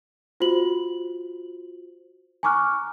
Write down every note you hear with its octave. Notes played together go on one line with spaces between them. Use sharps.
F4 F#4 C5 F#7
G#5 A#5 C#6 D6 F6 F#6